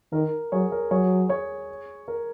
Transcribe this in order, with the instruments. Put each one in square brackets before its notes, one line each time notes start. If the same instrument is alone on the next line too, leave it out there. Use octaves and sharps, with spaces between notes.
[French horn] D#3 [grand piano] A#4
[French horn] F#3 [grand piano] G#4 C#5
[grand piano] A#4
[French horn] F#3 [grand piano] G#4 C#5
[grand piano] G#4 C#5
A#4